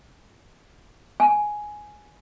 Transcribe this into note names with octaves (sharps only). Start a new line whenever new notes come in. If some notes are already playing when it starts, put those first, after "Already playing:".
G#5